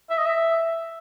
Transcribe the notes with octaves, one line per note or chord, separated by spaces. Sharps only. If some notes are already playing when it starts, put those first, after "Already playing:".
E5
D#5
E5